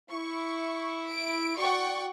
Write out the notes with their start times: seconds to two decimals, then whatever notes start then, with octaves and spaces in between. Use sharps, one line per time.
0.10 E4 C#6
1.07 D7
1.57 F#4 D5 F#5 G5 C#6